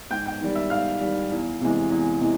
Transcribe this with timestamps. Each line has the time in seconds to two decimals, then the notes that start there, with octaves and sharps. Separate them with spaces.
0.11 G#2 G5 G6
0.26 G5 G6
0.41 D#3 G3
0.55 E5 E6
0.70 G#2 F5 F6
1.01 D#3 G3
1.31 E2
1.61 C3 E3 G#3
1.90 E2
2.20 C3 E3 G#3